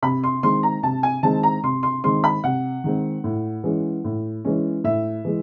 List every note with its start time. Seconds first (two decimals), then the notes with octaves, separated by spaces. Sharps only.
0.02 C3 B5
0.24 C6
0.43 D#3 G#3 C4 C6
0.63 A#5
0.83 C3 A5
1.03 G#5
1.23 D#3 G#3 C4 A5
1.43 A#5
1.63 C3 C6
1.83 C6
2.04 D#3 G#3 C4 C6
2.24 B5
2.44 C3 F#5
2.84 D#3 G#3 C4
3.24 A2
3.64 E3 G#3 C#4
4.04 A2
4.45 E3 G#3 C#4
4.84 A2 E5
5.25 E3 G#3